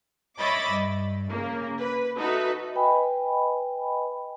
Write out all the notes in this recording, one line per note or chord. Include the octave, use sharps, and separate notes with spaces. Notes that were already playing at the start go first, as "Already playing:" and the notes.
C#5 D#5 E5 B5 D6 A6
G2
C#3 A#3
B4
D#4 F#4 A4 B4 E5
B4 D#5 G5 G#5 B5